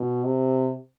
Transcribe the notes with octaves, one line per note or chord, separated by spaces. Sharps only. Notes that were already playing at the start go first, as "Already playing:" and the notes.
Already playing: B2
C3